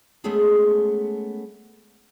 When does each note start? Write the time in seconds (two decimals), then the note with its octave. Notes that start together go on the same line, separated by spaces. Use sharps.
0.24 G#3 A3 B3 C#4 G#4 A4